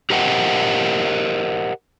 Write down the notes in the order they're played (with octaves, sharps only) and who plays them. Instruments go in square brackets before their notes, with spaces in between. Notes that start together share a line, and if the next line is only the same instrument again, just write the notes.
[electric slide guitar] G4 A#4 C5 D#5 F#5 G5